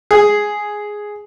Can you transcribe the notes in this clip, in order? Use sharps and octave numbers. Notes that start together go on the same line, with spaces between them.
G#4